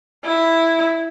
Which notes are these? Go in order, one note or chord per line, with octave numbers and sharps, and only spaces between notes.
E4